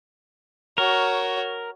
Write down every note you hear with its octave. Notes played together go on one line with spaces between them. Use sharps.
F#4 A#4 C#5